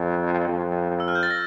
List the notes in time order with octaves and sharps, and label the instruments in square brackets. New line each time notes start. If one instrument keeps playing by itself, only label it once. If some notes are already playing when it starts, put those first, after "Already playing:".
Already playing: [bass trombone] F2
F2
[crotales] E6
F6
G6
A6
A#6